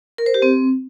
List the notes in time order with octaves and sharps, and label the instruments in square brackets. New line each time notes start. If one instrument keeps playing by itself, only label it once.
[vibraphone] A#4
C5
G4
C4